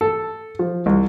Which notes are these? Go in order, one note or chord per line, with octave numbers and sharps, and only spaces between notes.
A4
F3
C2